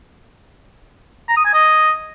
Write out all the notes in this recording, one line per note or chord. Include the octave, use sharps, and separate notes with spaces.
A#5
D#6
G#5
D#5